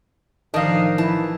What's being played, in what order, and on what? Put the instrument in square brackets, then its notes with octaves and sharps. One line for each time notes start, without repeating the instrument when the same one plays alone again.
[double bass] A1 F3 [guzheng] D#3 [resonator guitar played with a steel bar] D4 D#4 [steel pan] D#5 F5
[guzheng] E3 [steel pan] E4 [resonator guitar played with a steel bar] A5